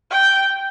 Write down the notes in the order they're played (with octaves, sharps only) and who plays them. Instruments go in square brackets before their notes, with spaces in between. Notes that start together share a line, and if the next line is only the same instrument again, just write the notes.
[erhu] G5